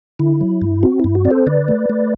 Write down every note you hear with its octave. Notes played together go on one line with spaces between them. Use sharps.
D3 E4
F#3
G2
C4 F#4
G2 E4
F#4
C4 D5
A4 C5
D3 B4 D5
A3
A3